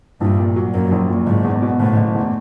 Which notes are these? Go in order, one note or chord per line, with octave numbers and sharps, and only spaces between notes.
A#1 G2
A#2
F#3
F#2 A#3
A#1
A#2
F#1 G#2
E2
B2
F#1 A2
F#1
E2